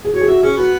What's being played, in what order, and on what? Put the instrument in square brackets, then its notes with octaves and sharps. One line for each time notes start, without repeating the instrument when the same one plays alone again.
[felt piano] G#4
[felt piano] F#4 [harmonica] C#5
[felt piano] G#4
[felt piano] F#4 [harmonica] E5
[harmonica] C#4 [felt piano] G#4
[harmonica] B3 [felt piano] F#4